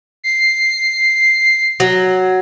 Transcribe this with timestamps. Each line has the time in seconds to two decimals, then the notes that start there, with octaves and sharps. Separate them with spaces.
0.24 C7
1.80 F#3